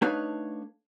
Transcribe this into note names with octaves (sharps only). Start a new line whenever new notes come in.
A3 D4 D#4 B4 C#5 F5